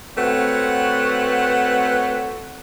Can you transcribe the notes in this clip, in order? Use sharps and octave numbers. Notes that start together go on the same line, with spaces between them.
A3 C4 F#4 B4 C#5 F#5